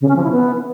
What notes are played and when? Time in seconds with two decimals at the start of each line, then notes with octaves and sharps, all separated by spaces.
0.01 C#3
0.08 C#4
0.16 F3
0.24 E4
0.31 B3